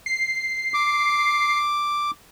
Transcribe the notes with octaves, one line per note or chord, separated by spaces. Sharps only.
C7
D6